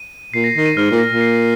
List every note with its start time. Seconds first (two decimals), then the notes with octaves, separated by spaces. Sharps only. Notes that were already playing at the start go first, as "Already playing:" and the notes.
Already playing: D#7
0.33 A#2 C7
0.44 A#6
0.55 D#3 C7
0.66 D#7
0.77 G#2 F6
0.91 A#2
0.98 A#6
1.06 A#2
1.21 C7